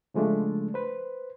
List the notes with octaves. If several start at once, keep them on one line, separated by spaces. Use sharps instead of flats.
C#3 F3 G#3 A3 D4
B4 C5